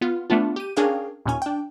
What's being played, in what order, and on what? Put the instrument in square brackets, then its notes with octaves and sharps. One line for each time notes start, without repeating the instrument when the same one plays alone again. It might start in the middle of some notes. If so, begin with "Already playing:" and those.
[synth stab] B3 F4
A3 B3 D4 F4
G4 D#7
C#4 D4 G#4 A#4 F5 G5
D#2 A#2 C#4 G#5
D4 G5